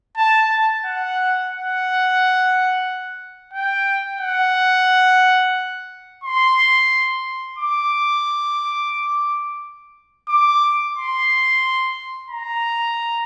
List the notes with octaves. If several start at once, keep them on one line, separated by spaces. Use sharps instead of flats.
A5
A5
F#5
F#5
G5
F#5
C6
D6
D6
C6
A#5